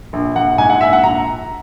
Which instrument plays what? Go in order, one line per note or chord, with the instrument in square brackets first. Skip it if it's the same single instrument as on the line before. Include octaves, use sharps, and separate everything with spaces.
[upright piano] A#1
A#1 F#5
G#2 G#5
F#5
A#1 E5
F#5
A#1 A#5